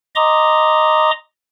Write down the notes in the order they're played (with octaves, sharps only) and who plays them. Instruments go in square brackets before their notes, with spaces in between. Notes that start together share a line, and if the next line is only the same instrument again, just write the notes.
[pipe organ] D#5 A#5 C6 D6 D#6